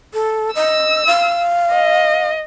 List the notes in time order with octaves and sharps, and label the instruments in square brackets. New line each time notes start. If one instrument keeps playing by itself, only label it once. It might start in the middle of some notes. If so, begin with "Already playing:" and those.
[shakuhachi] A4
[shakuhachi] D#5 [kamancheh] E6
[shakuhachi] F5
[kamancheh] D#5